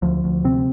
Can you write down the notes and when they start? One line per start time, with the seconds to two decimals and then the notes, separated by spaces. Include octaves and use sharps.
0.02 D2 F3
0.24 D2
0.44 C3 C4